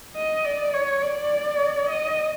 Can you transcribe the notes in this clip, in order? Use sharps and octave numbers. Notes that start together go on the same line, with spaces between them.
D#5
D5
C#5
D5
D#5